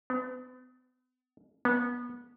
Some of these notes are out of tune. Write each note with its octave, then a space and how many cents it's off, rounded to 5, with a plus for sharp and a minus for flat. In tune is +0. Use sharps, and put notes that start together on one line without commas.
B3 +40
B3 -25